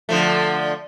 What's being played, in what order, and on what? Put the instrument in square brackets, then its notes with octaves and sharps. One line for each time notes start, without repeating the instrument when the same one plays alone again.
[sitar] D3 F3 A3